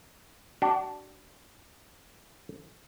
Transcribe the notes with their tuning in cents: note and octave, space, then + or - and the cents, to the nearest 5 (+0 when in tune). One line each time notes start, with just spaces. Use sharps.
D4 +0 F#4 +35